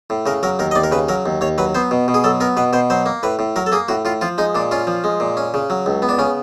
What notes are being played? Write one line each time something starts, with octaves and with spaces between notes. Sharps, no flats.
A2
C#3 A#4
F#3 A#4
D#2 A#4
D#5
D#2 D5
A#4
C#3 B4
F#3 A#4
D#2
D#2 C#5
F#3 B4
B3 C5
B2
B2
G#4
F#3 A4
B3 A#4
B2 B4
B2 C5
F#3 C5
A#3
A2 B4
A2
F#3 A#4
A4
A#3 G#4
A2 F#4
A2 F4
F3 F4
G#3 D#4
A#2 D4
C#4 F4
F3
G#3
A#2
C#4
C#3
F#3
C#2
B3
D4
C#3 C#4